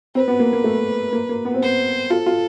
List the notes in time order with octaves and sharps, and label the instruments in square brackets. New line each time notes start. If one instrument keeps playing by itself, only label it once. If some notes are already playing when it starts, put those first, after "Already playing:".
[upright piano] C4 [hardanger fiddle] B4
[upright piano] B3
A#3
A#3
A3
A#3
A#3
B3
C4
[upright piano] B3 [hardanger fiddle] C5
[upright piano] F4 [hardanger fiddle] A4
[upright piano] F4